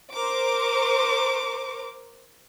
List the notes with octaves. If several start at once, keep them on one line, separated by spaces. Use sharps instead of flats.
A#4 C5 D6